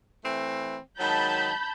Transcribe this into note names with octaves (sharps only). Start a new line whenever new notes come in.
E3 A3 C4
D#3 F#3 G#3 A5 B5 G6